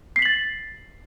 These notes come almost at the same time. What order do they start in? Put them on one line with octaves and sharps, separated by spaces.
C7 B6 F#7 A6